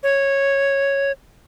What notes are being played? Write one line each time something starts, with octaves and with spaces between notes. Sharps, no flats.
C#5